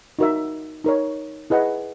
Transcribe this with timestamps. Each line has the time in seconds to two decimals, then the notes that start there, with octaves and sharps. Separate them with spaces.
0.19 D#4 F#4 A#4 E5
0.84 D#4 A#4 C#5
1.50 E4 G#4 B4 D#5 F#5